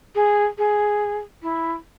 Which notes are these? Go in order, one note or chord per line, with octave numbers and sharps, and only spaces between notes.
G#4
G#4
E4